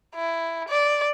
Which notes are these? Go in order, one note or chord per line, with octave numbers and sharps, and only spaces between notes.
E4
D5